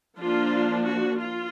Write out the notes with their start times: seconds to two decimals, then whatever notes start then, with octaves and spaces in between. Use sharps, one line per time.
0.20 F3 A#3 D4 F4
0.85 F#4
1.18 F4